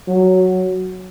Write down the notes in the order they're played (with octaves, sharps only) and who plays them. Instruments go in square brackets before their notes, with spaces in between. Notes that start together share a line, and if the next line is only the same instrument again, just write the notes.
[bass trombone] F#3